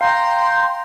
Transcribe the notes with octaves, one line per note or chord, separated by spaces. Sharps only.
F5 G5 A#5 C6